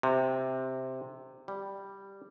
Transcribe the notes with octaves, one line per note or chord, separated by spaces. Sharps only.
C3
G3